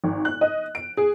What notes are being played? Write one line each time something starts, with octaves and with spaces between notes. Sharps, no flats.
G#1
F#6
D#5
D7
G#4